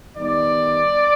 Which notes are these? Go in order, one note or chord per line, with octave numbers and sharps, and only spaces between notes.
D#3 G3 B3 D#4 D5